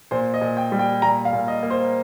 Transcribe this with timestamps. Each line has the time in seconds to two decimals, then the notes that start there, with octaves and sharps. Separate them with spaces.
0.11 A#2 C5
0.34 D#5
0.41 A#2
0.57 G5
0.72 G3
0.79 G5
1.02 A#2 A#5
1.25 F5
1.33 A#2
1.48 D#5
1.63 A#3
1.70 C5